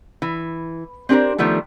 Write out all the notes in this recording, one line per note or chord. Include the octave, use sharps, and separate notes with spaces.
E3
C4 D4 G4 A#4 C5
D#3 F3 G3 A3 B3